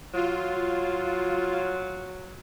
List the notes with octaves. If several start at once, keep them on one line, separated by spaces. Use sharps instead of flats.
F#3 F4